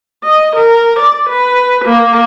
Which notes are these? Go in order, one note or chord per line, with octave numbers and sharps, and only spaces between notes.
D#5
A#4
D5
B4
A#3